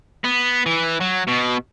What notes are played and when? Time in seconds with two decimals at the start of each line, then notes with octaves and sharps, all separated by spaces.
0.24 B3
0.66 E3
1.01 F#3
1.28 B2